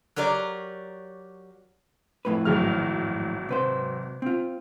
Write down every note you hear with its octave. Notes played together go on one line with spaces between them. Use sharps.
F#3 G4 A#4 C#5 D5
F2 A2 B4
G#1 F#3 F6
C3 B4 C5
C4 F4